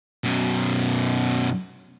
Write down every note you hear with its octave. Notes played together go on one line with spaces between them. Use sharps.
F#2 B2